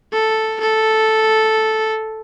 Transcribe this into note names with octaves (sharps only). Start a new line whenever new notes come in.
A4
A4